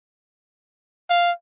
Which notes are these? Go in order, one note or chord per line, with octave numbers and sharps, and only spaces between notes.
F5